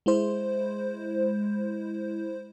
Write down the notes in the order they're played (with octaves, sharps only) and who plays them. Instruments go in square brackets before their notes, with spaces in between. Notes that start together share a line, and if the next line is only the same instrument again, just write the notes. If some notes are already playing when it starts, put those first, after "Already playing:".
[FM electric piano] G#3 E4 C5